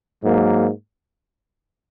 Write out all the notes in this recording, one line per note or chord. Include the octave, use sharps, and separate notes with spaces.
G#2 F#3 A#3